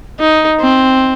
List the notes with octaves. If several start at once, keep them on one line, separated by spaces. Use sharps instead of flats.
D#4
C4